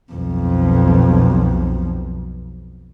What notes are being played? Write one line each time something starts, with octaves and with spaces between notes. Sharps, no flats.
B1 F2